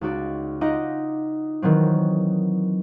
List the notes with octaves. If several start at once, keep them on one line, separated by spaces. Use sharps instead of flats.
C#2 D#4 F#4 D5
D#4 F4 D#5 F#5 D6
D#3 E3 F#3 C4